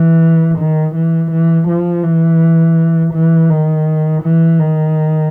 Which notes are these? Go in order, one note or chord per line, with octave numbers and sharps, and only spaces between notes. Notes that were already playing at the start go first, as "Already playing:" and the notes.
Already playing: E3
D#3
E3
E3
F3
E3
E3
D#3
E3
D#3